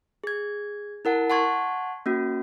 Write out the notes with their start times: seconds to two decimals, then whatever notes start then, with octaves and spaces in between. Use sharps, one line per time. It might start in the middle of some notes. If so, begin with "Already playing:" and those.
0.24 G#4 G#6
1.05 E4 A#4 F#5 A5
1.30 F#5 A5 C6 C#6 G#6
2.06 A#3 C#4 F#4